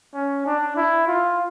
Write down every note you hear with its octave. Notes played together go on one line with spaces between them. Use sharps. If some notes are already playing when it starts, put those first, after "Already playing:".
C#4
D4
E4
F4